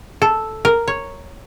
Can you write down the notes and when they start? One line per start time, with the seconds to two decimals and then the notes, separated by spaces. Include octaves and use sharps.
0.22 A4
0.65 A#4
0.88 C#5